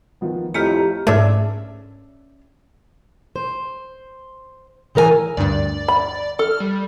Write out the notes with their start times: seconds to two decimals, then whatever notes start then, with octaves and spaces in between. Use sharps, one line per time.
0.21 D#3 F3 B3
0.54 F2 A2 G4 D#5 A#5 F6 B6 C#7
1.07 G#2 A3 C#4 D4 E5
3.36 C5
4.95 C#3 E3 A#4 E5 G#5
5.37 D2 G2 D5
5.88 B5
6.39 A4 F6
6.60 G3